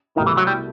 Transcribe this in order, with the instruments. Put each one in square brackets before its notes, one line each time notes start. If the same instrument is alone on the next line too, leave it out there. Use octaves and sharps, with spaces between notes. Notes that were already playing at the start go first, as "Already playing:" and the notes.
[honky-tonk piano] C2 B2 A3 E4 [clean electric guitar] D#3
[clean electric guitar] E3
F#3
G3